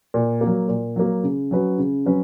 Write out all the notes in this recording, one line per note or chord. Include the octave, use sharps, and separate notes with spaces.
A#2
A#3
F#3
A#2
F#3 A#3
C#3
F#3 C#4 F#4 B4
C#3
F#3 C#4 F#4 B4